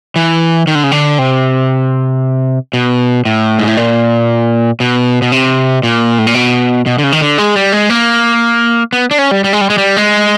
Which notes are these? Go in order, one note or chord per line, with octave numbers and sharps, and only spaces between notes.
E3
D#3
D3
C#3
D3
C3
B2
A2
G#2
A2
A#2
B2
B2
C3
A#2
A2
A#2
B2
B2
D3
C#3
D#3
D3
G#3
G3
G#3
A#3
B3
D4
C#4
G3
G3
G#3
G3
G#3
G3
G#3